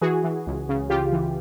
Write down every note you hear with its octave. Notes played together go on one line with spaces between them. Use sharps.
E3 F#4 G#4
E3
C#2
C#3
C#3 F4 G4
E3